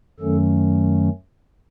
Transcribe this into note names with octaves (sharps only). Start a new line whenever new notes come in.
F#2 D#3 F#3 A3 C#4 A4